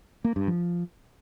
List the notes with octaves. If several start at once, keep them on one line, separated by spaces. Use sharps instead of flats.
A#3
G2
F3